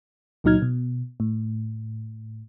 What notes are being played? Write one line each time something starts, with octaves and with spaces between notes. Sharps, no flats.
C#2 A#2 F#3 D#4 F6 G#6
B2
A2